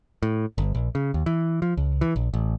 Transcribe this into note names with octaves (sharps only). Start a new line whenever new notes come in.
A2
G1
A#1
C#3
D#2
E3
F3
C#2
E3
A#1
A1